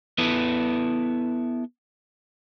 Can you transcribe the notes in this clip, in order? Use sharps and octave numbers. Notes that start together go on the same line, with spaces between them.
B3 E4 A4 B4